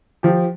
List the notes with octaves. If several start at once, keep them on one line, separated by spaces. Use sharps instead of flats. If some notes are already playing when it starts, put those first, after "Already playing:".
F3 G4